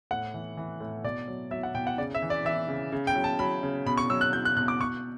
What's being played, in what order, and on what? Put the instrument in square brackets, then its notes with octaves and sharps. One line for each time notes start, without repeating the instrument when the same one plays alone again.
[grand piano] A2 F#5
E3
E3
A2
B2 D5
F#3
F#3 E5
F#5
B2 G5
F#5
C#3 D5
E5
E3
D5
E3 E5
C#3
C#3
G5
F#3
A5
F#3 B5
C#3
B2 B5
C#6
F#3 E6
F#6
F#3 G6
F#6
B2 F#6
D6
B2 C#6